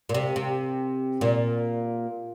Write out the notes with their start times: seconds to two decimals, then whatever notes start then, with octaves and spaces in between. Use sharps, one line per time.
0.09 A#2
0.14 C3
0.36 C3
1.21 A#2